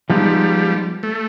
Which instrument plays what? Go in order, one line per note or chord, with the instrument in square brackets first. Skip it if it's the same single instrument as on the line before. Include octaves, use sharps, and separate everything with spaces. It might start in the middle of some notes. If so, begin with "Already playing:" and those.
[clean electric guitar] F3 G#3 B3 D#4 [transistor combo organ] G3
[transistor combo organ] A3